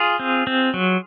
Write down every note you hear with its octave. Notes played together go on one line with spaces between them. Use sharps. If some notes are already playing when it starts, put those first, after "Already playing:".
Already playing: F4 G#4
C4
C4
F#3